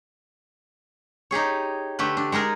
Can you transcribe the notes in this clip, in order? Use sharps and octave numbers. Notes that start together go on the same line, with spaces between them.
D#4 G4 G#4 C#5
D3 A3 G4 B4
D4
G#3 D#4 G#4 A#4